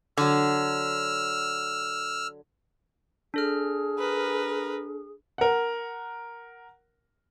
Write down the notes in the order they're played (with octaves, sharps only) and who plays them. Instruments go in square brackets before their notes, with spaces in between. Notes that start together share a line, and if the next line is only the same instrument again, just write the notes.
[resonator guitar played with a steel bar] D3 F#3 [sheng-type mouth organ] E6 F6
[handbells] D4 A4 F6 [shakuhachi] G#4
[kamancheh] A#4 B4
[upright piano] A#4 F#5